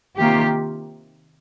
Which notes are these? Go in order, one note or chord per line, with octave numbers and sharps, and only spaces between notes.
C3 D#3 A#3 F4 G4